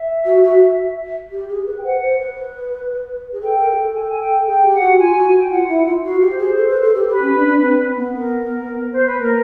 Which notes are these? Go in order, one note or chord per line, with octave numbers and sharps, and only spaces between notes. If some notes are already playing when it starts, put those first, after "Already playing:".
Already playing: E5
F#4
F#4
G4
G#4
B4
G5
C5 F#5
C5
B4
G#4
A4 G5
A#4
G#4
A4
G#5
G5
G#5
G5
G#4 G5
G4
F#5
F#4
F4 G#5
F#4
G5
F4 F#5
E4
F4
F#4 F5
G4
C5
G#4
A4
B4
A4
G4
G4 B4
C#4
D4
D4
C4
C4
B3
A#4
C5
B4
A#3 A#4